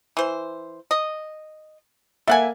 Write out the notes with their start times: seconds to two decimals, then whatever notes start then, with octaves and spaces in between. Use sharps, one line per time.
0.17 E3 C5
0.91 D#5
2.28 A#3 A4 E5 F#5 G#5